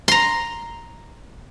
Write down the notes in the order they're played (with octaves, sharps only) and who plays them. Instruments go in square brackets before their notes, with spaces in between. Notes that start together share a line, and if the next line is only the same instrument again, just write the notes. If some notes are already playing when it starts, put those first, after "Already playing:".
[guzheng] A#5 C6